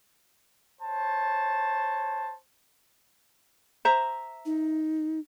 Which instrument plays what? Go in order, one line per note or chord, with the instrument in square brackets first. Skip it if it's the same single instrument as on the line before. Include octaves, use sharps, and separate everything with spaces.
[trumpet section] C5 C#5 A5
[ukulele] C5 E5 A#5
[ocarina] D#4